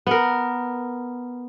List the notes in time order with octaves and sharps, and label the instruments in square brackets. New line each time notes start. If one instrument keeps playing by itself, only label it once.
[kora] B3 A#4